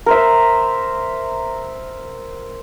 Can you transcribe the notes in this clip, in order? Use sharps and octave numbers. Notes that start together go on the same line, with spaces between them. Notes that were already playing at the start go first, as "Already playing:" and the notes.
A#4 C5 E5